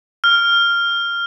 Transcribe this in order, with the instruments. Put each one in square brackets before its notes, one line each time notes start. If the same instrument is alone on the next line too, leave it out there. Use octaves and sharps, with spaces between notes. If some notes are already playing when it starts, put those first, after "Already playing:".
[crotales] F6